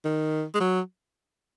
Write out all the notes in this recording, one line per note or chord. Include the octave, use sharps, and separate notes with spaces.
D#3
G#3
F#3